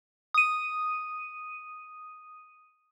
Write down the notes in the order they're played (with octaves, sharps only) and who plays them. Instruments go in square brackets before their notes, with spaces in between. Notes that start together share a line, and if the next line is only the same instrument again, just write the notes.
[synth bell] D#6 D#7